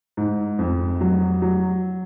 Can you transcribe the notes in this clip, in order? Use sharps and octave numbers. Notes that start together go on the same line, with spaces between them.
G#2
F2
F#3
F#3